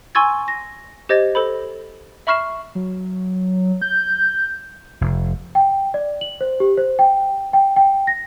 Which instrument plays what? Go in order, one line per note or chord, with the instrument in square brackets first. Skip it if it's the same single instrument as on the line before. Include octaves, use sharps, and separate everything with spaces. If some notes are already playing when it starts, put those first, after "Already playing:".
[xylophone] G#5 C6 C#6 E6 G#6 A6
A#6
G4 C5 D#5 G#6 A6
A4 C5 B5
E5 B5 C#6 F6 C7 E7
[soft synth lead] F#3
G6
[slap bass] F1
[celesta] G5
D5
F#7
C5
G4
C5
G5
G5
G5
A#6